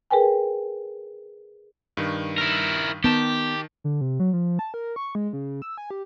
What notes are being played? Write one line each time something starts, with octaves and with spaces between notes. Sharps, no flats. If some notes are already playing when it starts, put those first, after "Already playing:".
G#4 A#4 B4 G5 G#5
G2 D#3
E4 A#4
D#3 B3 G4 A5 E7
D3
C3
F#3
F3
A5
A#4
C#6
G#3
C#3
E6
G#5
G4